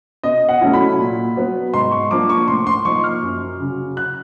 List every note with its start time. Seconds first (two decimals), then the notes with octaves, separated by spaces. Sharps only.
0.23 B2 D#5
0.49 F#5
0.61 F#3 A3 C#4 E4
0.73 B5
0.98 A#2
1.36 F#3 B3
1.74 G#2 C6
1.91 C#6
2.11 F3 A#3 D4 D6
2.30 C#6
2.48 A2 C6
2.67 C6
2.85 F3 A#3 D#4 C#6
3.04 F6
3.22 F#2
3.60 C#3 F#3
3.97 F#6